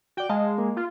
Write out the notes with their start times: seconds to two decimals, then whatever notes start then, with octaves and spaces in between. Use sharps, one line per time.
0.17 F#4 D5 G5
0.30 G#3 D#5 F5 A5
0.58 A#3
0.77 F4